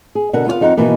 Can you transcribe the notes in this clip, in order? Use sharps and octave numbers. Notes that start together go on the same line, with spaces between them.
G#4
B2 D3 A#4 F#5
B3 F4 C#5 F5
F2 D#4 C5 F5 F#5
B2 D#3 E3 A#3